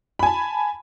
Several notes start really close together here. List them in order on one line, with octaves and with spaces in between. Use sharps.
B5 G#5 A5